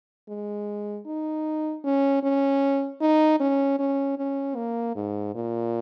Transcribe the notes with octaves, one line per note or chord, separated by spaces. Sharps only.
G#3
D#4
C#4
C#4
D#4
C#4
C#4
C#4
A#3
G#2
A#2